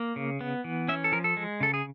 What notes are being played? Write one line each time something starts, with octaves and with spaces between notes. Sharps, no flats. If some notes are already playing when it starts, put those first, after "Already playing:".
Already playing: A#3
C#3
B3
E3
C#4 E5
A4
F3 A#4
A4
G#3
C#3 A4
G#4